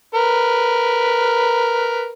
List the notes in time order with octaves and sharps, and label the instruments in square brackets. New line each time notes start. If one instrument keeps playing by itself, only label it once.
[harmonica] A#4 B4